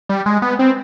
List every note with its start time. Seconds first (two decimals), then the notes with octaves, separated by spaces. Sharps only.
0.09 G3
0.26 G#3
0.42 B3
0.59 C4